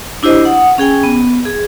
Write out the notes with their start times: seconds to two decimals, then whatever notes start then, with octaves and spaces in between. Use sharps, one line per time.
0.23 D4 E4 G4 C5 D#5
0.45 F#5 D#6
0.78 C#4 G#4 G5 G#5
1.03 B3
1.45 G#4